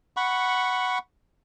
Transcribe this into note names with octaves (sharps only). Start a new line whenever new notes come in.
F#5 B5 C#6